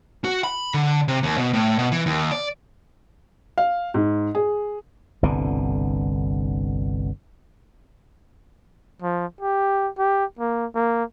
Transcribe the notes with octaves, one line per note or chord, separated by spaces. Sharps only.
F#4
B5
D3
C3
D#2
B2
A2
B2
E3
D#2
D5
F5
G#2
G#4
G1 C2 B2 D3
F3
G4
G4
A#3
A#3